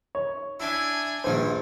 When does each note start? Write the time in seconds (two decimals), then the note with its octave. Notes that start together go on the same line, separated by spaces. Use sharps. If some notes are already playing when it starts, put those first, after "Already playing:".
0.15 C#5
0.60 D4 E4 E5 G#5
1.24 A#1 G2 D#3 E3 C5